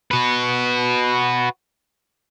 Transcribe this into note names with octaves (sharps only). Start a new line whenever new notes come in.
F#4 B4